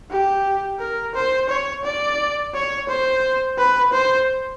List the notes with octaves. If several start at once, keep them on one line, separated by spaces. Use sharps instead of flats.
G4
A#4
C5
C#5
D5
C#5
C5
B4
C5